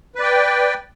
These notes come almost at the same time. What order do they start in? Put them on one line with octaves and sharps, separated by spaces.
B4 D5 G5